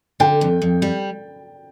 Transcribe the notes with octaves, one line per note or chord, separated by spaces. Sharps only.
D3 G5
F2
F2
G3